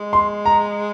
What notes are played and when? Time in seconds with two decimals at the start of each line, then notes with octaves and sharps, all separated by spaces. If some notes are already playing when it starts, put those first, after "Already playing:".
Already playing: G#3
0.13 C6
0.46 A#5